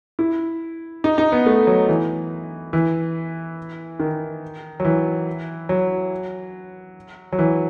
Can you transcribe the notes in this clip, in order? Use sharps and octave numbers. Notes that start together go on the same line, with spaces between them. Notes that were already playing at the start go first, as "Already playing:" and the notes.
E4
D#4
D#4
B3
A3
F#3
E3
E3
D#3
F#3
E3
F#3
F#3
E3